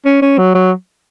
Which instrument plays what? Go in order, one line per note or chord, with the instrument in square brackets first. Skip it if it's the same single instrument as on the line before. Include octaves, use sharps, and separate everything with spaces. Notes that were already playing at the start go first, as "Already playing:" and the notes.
[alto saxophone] C#4
C#4
F#3
F#3